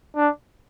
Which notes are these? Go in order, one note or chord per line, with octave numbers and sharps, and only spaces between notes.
D4